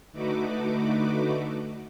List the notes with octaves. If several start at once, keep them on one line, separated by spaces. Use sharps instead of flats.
D3 A3 D#4 F#4 B4 D6